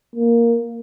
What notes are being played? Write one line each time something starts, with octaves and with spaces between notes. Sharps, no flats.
A#3